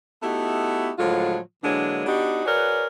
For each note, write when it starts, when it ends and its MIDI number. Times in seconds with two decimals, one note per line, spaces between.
0.23 0.91 57
0.23 0.91 59
0.23 0.91 63
0.23 0.91 64
0.23 0.91 66
0.23 0.91 67
0.98 1.37 45
0.98 1.37 50
0.98 1.37 53
0.98 1.37 54
0.98 1.37 56
0.98 1.37 65
1.63 2.04 50
1.63 2.04 52
1.63 2.04 54
1.63 2.04 56
1.63 2.04 58
1.63 2.04 62
2.06 2.44 59
2.06 2.44 62
2.06 2.44 63
2.06 2.44 66
2.06 2.44 67
2.45 2.86 66
2.45 2.86 68
2.45 2.86 70
2.45 2.86 71
2.45 2.86 73
2.45 2.86 74